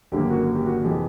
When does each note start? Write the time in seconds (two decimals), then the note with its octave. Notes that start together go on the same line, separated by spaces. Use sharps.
0.12 G#1 F#2 D3 G3 A#3 G4
0.30 F#4
0.55 G4
0.65 F#4
0.83 F2 C3 E3 G#3 G4